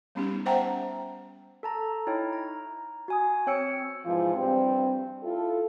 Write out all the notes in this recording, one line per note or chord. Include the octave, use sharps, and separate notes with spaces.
G3 B3 C#4 D#4 G4
C5 E5 F#5 G5 A5 A#5
A4 A5 A#5
D#4 E4 C#5 G5
A#5
F#4 G#5 D#6
C4 C#5 G5 E6 C#7
G#2 B2 E3 F3
G2 G3 C4
E4 F4 A4